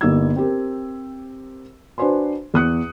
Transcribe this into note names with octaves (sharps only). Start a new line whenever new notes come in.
G1 A#3 D#4 G4 E6 G#6
C4 G4 A#4
D4 F#4 B4 C5 G#5 C6
E2 D#6 F#6 C#7